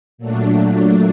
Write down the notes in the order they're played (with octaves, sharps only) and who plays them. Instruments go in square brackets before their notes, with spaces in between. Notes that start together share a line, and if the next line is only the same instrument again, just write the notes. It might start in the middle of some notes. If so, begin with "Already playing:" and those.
[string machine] A#2 F#3 A3 D4